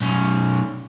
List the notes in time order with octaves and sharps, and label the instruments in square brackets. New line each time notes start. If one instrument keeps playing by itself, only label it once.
[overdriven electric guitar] B1 C#4